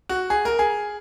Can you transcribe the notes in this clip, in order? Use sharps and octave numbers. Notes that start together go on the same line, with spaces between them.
F#4
G#4
A#4
G#4